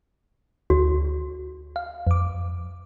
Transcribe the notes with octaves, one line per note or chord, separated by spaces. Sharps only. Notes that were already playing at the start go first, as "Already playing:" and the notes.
D2 F#4
F5
F2 D6